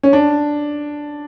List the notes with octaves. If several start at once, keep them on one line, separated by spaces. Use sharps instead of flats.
C#4
D4